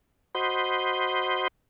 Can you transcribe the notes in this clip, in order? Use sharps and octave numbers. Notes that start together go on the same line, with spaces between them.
F#4 C5 D#5 B5 C6 G6